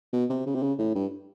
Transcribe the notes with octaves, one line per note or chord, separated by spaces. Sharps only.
B2
C3
C#3
C3
C#3
A2
G2